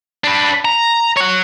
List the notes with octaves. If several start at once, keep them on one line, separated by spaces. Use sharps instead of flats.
D4 B4
A#5
C#5 F#5